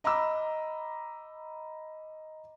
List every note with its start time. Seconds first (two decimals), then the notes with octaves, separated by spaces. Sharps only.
0.04 D#5 A#5 B5 D6 E6